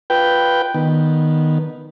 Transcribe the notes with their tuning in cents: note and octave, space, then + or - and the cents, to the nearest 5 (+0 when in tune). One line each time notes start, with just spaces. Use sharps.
F4 +0 B4 +0 G5 +0
D#3 +0 B3 -10